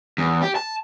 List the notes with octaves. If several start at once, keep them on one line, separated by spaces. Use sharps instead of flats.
E2
G4
A5